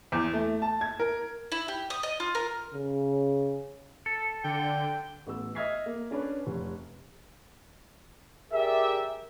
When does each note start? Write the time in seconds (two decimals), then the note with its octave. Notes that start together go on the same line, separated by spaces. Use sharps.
0.12 E2
0.33 A3
0.62 A5
0.81 G#6
1.00 A#4
1.52 E4
1.68 G4
1.90 D#6
2.03 D#5
2.20 F4
2.35 A#4
2.74 C#3
4.06 A4
4.44 D3 G5
5.27 A1 B3 E6
5.55 D#5 E5 F6 G#6 B6 C7
5.86 A#3
6.11 C#4 D4 B4 C#5
6.47 F1
8.52 G4 G#4 A#4 D5 E5